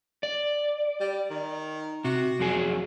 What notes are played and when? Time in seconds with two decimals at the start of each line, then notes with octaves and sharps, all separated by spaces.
0.23 D5
1.00 G3
1.30 D#3
2.04 C3 F#4
2.40 F2 F#3 G#4